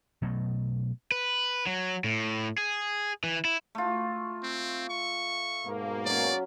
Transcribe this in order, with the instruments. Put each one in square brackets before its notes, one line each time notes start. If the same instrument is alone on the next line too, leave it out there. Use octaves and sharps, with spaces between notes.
[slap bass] B2 F#3 A3
[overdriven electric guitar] B4
F#3
A2
G#4
E3
E4
[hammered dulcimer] A3 F4
[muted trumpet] C4
C#6
[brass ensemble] G#2 B2 A#3
[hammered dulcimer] F#3 C#4 [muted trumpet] D5